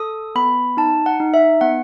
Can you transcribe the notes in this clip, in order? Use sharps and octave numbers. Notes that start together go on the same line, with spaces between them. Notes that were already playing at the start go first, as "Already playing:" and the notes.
Already playing: A4 D#6
B3 B5
D#4 A5
F#5
D#4
E5
B3 F#5